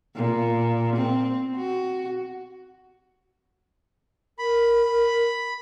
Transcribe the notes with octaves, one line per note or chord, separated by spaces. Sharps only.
A#2
C4
F#4
A#4 B5